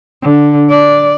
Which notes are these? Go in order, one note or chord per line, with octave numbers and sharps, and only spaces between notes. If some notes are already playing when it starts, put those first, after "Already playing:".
D3
D5